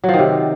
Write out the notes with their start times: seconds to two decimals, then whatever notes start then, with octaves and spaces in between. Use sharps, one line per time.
0.04 F#3
0.09 F3
0.14 D#3
0.19 C3